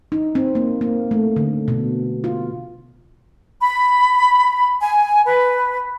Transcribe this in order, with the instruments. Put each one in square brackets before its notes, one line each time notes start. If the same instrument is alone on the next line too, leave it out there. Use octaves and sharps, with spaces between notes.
[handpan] D#4
C4
A#3
A#3
A3
D3
B2
F4
[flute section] B5
G#5
B4